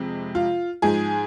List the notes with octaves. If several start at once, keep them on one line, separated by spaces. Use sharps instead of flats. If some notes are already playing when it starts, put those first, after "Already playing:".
Already playing: F2 C3 G#3
F4
G#2 F3 G#3 G#4